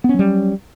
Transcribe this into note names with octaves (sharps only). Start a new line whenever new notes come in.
F#3 G3 B3 C#4